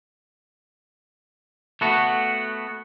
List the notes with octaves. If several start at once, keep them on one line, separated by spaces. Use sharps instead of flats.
A3 B3 F#4